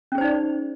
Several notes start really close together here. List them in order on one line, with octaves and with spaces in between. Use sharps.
C#4 G#4 C5 D#4 D5